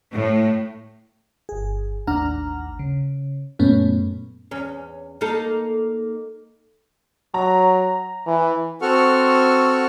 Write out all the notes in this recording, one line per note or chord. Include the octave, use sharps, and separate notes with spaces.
A2
G1 G#4
A1 D#2 D4 F#5 A#5 F6
C#3
F#2 A#2 A3 B3 C#4
E2 C#4
A#3 D#4 A4
F#3 A#5
E3
C4 F#4 A4 F#5 C#6 F6